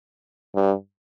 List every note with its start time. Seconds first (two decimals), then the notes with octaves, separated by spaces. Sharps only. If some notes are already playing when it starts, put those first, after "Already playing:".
0.55 G2